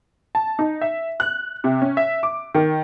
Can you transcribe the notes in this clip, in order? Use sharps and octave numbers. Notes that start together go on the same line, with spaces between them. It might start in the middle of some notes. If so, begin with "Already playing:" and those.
A5
D#4
E5
F#6
C3
C#4
E5
D6
D#3